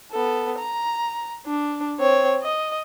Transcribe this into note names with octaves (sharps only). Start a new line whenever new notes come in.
B3 A4
A#5
D4
C4 C#5
D#5